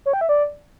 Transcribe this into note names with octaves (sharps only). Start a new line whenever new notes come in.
C#5
G5
E5
D5